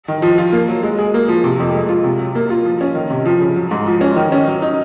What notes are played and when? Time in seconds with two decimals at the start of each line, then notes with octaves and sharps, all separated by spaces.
0.08 D#3
0.22 F3
0.38 F4
0.52 A#3
0.69 F#3
0.83 G#3
0.99 G#4
1.14 A#3
1.28 F3
1.44 C3
1.60 F2
1.75 G#3
1.89 F4
2.04 C3
2.19 F#3
2.35 A#3
2.50 F4
2.65 F3
2.81 C#4
2.95 D#3
3.10 C3
3.25 F3
3.40 C#3
3.56 F#3
3.71 G#2
3.86 F3
4.01 C#4
4.16 D#3
4.32 C#4
4.47 F#3
4.62 D#4